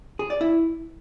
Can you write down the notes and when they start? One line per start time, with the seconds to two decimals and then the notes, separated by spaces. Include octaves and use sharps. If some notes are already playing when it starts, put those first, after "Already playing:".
0.19 G#4
0.30 D5
0.41 E4